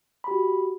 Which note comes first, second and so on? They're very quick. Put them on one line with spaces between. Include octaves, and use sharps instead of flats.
B5 G4 F#4